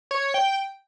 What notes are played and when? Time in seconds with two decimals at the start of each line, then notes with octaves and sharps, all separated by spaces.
0.11 C#5
0.34 G5